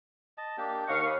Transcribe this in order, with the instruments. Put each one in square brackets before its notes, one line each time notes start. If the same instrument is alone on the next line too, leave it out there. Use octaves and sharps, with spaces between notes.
[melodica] D#5 A5
A#3 D4 G4
[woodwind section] D#2 F5 C#6 [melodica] D#5 F#5
[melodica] B5 D#6